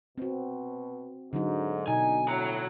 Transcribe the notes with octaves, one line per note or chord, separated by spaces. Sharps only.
B2 C4 F#4
G#2 D3 F#3 D#4
B2 D#4 G#5
A2 F#4 A#5